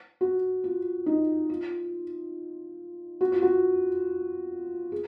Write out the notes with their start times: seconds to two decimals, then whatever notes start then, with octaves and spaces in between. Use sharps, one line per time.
0.21 F#4
0.64 F4
1.06 D#4
1.49 F4
3.21 F#4
3.32 F4
3.43 F#4
4.92 G#4